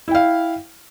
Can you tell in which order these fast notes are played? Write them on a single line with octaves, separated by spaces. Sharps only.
E4 G5 F5